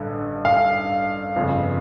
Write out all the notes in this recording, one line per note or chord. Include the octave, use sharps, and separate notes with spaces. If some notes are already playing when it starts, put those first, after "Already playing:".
Already playing: A1 G2 D3
F5
G1 F2 C#3